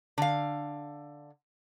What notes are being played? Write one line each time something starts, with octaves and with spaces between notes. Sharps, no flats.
D3 F5